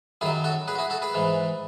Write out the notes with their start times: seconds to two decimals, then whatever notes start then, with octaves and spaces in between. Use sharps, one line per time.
0.21 F#2 D#3 F#3 E4 G#4
0.44 F#4 A4
0.68 G#4 B4
0.75 F#4
0.78 E4 G#4
0.90 F#4 A4
1.02 G#4 B4
1.14 G#2 E3